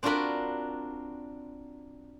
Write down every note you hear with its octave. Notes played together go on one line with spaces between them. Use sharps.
C4 D4 F4 F#4 A#4 B5